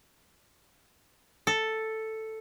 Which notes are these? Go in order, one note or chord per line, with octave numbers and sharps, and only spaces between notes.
A4